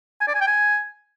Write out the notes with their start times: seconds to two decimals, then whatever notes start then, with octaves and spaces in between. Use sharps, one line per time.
0.21 G#5
0.28 D5
0.34 G#5
0.41 G5
0.48 G#5